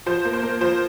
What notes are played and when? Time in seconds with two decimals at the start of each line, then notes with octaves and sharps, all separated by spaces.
0.06 F3 C5
0.25 A#3
0.33 C5
0.43 A#3
0.61 F3 C5